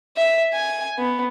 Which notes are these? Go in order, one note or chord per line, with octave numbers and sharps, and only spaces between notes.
E5
G#5
B3